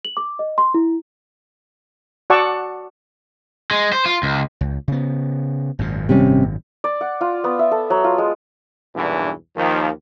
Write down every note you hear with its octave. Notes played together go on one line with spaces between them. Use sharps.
F#7
D6
D#5
C6
E4
F#4 D5 F#5 A5 C#6 E6
G#3
C5
F4
C#2
C#2
C#3 B3
G#1 F#2 A#2
C3 G3 C#4
D5
F#5
F4
B3
E5
A4
F#3
F4
G#3
B1 E2 G2 A#2 E3 D4
D#2 D#3 F3